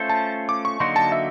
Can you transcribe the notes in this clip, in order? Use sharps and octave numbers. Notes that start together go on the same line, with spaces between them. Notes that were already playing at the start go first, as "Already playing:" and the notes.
Already playing: A3 C#4 F4 A4 C5
A5
D6
C#6
D3 F#3 A#3 D#4 F#4 C6
A5
E5